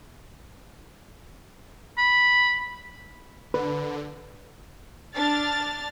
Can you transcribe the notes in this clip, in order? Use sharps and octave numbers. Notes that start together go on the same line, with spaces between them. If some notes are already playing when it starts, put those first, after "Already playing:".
B5
D3 B4
D4 F6 A6